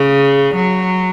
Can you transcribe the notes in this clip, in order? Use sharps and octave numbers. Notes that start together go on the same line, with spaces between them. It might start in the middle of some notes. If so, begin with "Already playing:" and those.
Already playing: C#3
F#3